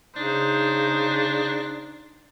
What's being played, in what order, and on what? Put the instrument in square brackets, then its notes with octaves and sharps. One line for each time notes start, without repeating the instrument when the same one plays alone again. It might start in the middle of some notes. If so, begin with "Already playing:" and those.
[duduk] C#3 [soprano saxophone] D4 [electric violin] D#4 C5